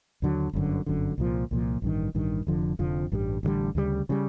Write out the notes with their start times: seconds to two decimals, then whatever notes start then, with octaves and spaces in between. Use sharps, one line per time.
0.22 D#2 D3 F#3
0.53 G1 F#2 D3
0.86 G1 F#2 D3
1.18 C2 A#2 F3
1.51 C2 A#2 F3
1.82 A1 G2 D#3
2.14 A1 G2 D#3
2.47 F1 F2 D3 F3
2.79 F1 F2 D3 F3
3.12 A1 G2 D3 G3
3.43 A1 G2 D3 G3
3.75 D2 C#3 E3 G3
4.09 C#3 E3 G3